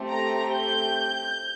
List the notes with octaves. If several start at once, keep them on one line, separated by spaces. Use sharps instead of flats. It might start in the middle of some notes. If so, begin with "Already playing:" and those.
Already playing: A3 C4 G4
A#5
G6